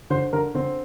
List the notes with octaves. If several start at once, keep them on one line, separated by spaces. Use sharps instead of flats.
D3 C5
D3 A#4
D3 C4